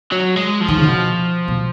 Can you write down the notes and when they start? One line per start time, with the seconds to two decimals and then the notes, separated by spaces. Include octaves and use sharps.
0.12 F#3
0.37 G#3
0.61 F3
0.68 D#3
0.77 C#3
0.85 B2
1.48 B2